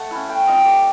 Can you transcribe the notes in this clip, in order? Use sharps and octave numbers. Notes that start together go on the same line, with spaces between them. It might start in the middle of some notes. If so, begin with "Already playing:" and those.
Already playing: A3 F#5 A5
C#4 E4
A3 G5
C4 F4 D#5
A3 D5